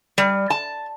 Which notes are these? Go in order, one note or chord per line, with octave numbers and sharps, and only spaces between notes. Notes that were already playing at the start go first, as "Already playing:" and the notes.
G3
A5